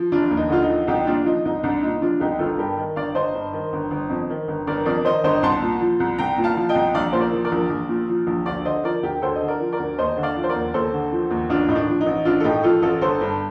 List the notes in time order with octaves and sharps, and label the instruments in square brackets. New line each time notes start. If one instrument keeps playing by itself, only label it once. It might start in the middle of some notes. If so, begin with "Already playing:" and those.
Already playing: [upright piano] F3
F1 D4 F4
D#2
D#4
D3 F4
D#4
F3
C2 D#4 G4
A#2 D4 F4
F3 D#4
C2 D#4
C2 D4
A#2 D#4
F3 D4 F4
C2 D#4 G4
G1 F4 A4
G2 G4 A#4
D#3
G1 D5 F5
G1 C5 D#5
G2
D#3
G1
G1
F2
D#3
G1
G1 A#4 D5
F2 A#4 D5
D#3 C5 D#5
G1 C5 D#5
C2 A5 C6
A#2
F3
C2
C2 G5 A#5
A#2
F5 A5
F3
D#5 G5
C2
A#1 D5 F5
A#2 C5
A#4 D5
F3
A#4 D5
A#1
A#1
A#2
F3
A#1
D2 D5 F5
D3 C5 D#5
F3 A#4 D5
D2 G4 A#4
D2 A4 C5
D#5
D3
A#4 D5
F3
A#4 D5
D2
D#2 C5 D#5
D3
D5 F5
F3
C5
A#4 D5
D#2
D#2 A4 C5
D3
F3
D#2
A1 D4 F4
A2 D#4
D4
F3
D#4
A1
A1 D4 F4
A4
A2 D#4 G4
F3 F4 A4
A1 F4 A4
G1 A4 C5
G2